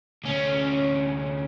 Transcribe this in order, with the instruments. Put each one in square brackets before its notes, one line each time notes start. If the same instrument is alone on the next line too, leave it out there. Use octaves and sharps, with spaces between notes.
[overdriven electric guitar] D2 C#4